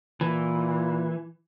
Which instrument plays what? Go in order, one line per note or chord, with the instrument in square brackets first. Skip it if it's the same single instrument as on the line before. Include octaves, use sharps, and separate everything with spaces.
[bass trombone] A#2 [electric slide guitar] E3